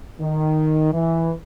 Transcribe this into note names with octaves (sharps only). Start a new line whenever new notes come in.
D#3
E3